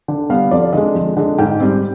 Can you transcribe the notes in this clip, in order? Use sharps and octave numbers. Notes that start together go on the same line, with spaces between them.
D3
G3 B3 F5
F2 D5
D3 G#3 D#5
F2
D3 G#3
G#2 G5
G3 C4